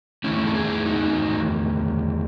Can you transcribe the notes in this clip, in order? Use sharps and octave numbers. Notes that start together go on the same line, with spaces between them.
E2 D#3 A3 C#4 E4
A4
E4 G#4
D#4 F#4